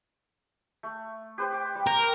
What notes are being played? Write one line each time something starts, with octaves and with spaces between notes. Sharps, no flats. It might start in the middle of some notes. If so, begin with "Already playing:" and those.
A3
G4 B4 C5
D6
G3
A#4 G5